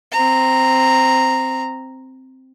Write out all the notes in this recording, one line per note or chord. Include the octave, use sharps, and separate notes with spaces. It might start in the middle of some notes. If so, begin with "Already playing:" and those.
C4 A#5